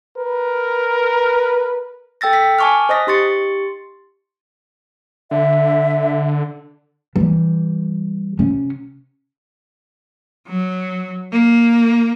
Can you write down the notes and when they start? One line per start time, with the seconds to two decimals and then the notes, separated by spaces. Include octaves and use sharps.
0.17 A#4 B4
2.21 A4 G5 E6 A6 A#6
2.33 B6
2.59 G#5 A5 C#6 D6 F6
2.89 C5 D#5 D#6 A#6 B6
3.07 D#4 G4 C6 C#6 A6 C#7
5.31 D3 E5
7.16 E3 G3
8.39 C3 C#4
10.48 F#3
11.32 A#3